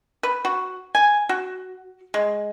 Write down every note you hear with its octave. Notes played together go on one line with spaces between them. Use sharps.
B4
F#4
G#5
F#4
G#3